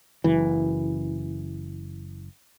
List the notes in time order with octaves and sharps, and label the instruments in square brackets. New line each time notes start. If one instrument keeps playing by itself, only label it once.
[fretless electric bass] F#1 E3